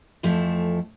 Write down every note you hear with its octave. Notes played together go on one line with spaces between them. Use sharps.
F2 E3 F3 A3